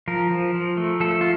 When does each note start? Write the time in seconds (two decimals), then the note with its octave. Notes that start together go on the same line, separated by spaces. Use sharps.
0.08 F3 A#4
0.31 F3
0.55 F3
0.77 A3
1.00 F3 A4
1.21 F4